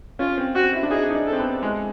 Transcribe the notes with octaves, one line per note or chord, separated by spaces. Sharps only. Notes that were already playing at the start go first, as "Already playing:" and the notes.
C#4 F4
C4
C4 F#4
E4
D4
D#4 G#4
D#4
D4
A4
C4
B3
G#3